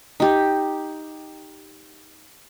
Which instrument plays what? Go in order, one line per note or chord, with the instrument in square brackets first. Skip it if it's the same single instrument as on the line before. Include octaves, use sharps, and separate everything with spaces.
[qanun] D#4 G4